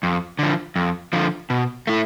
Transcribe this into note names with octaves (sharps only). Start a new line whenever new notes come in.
F2
D3 F3
F2
D3 F3
B2
A3 E4